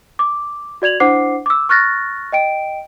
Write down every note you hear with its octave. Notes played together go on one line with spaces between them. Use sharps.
D6
F#4 D5 G#6 F7 F#7
D4 E4 C5 F#5 D6 C7
D6 E6
C#6 F6 F#6 A6 A#6
D#5 G5 D7